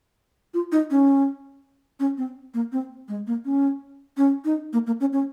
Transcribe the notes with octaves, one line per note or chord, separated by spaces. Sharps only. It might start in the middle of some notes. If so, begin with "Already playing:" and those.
F4
D#4
C#4
C#4
C4
A#3
C4
G#3
A#3
C#4
C#4
D#4
A#3
A#3
C#4
C#4